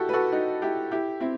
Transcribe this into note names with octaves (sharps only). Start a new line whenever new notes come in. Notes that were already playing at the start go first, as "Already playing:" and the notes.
Already playing: E4 F#4 G4 A4
B4
F#4 A4
D#4 F#4
E4 G4
E4 G4
C4 E4